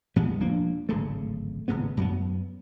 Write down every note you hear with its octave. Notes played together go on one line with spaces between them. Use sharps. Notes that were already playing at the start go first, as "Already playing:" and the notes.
E2 A2 G3 B3
E1 F3 A#3 D4
D1 G#1 C#3 A3
G#1 A2 C#3 B3
F#2 F#3 G3 B3